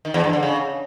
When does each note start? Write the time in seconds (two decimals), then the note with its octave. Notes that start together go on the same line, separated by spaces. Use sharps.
0.05 D#3
0.14 E2
0.24 G2
0.33 D3
0.43 C#3